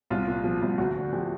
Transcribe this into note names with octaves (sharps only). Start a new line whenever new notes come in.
C2 F4
A#2
F3
C2
D2 F#4
D3
F3 G4